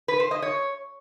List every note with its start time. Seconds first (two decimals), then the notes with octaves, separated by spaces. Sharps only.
0.08 B4
0.20 C5
0.31 D#5
0.42 C#5